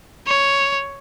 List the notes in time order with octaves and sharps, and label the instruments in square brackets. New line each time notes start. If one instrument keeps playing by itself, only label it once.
[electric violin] C#5